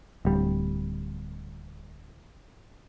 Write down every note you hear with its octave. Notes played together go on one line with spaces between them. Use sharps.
D1 G3